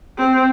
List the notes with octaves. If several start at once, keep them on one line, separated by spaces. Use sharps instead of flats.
C4